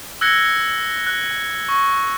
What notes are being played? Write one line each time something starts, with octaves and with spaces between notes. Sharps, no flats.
E6 F#6 G#6 A#6 C#7 G7
F#6
C#6